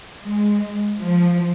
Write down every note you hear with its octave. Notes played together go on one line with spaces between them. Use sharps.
G#3
F3